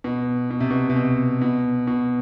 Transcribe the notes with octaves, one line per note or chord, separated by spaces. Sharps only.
B2
B2
C3
B2
C3
B2
B2
B2